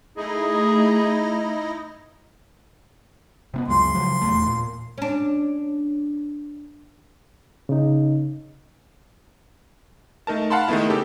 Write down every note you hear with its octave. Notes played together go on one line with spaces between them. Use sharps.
A3 D#4 E4 G#4 D#5
C3 A#3 B3
C#2 F#2 G#3 C6
C#3 F3 F#3
D#1 E2 A3
A#2
C#4 D4
C#3 D#4
A3 D#4 A#4 A5
F5 F#5 A5 B5 C6
D#3 G#3 A3 B3 E4
C#3 G4 A4